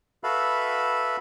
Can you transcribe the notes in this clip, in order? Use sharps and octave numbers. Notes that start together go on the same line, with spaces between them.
F#4 A4 B4 E5 F5 B5